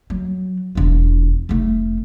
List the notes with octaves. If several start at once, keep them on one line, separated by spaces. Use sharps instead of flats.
F#3
E1 F4
F1 A3